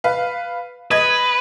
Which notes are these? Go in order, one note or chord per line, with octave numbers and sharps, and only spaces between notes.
B4 F5
B4 D#5 G#6